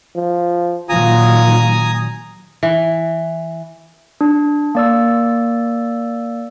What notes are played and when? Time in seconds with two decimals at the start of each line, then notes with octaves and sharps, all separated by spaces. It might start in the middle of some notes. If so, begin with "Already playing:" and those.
0.16 F3
0.89 A#2 D#3 F#3 F4 G#5 A#5 D#6
2.63 E3
4.21 D4
4.75 A#3 D5 E6